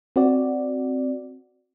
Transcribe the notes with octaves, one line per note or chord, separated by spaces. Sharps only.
C4 F#4 D5